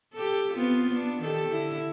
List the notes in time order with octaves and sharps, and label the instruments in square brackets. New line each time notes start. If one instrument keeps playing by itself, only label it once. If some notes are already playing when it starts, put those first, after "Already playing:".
[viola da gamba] G4 A4
B3 C4 F4
B3 D4
D#3 G4 A4
D3 E4